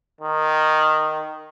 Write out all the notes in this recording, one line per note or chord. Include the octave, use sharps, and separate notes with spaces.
D#3